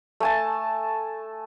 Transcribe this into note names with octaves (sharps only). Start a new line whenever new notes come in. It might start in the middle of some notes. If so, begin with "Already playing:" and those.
A3 G#5 A5